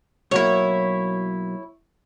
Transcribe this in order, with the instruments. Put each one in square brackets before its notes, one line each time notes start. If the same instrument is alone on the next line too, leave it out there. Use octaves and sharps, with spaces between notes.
[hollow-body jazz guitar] B1 F#3 A#3 [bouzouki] E4 C#5